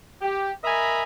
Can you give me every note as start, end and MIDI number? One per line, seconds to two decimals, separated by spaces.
0.21 0.51 67
0.64 1.03 70
0.64 1.03 75
0.64 1.03 76
0.64 1.03 80
0.64 1.03 82
0.64 1.03 83